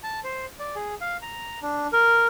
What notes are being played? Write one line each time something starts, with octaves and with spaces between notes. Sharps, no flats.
A5
C5
D5
G#4
F5
A#5
D4
A#4